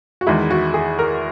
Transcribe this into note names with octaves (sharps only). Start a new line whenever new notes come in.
F#4
E2 D#3 G#3 E4
F#4
G#4
A#4